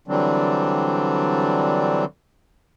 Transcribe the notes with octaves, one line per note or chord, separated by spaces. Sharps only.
D3 E3 F#3 G3 C4 D4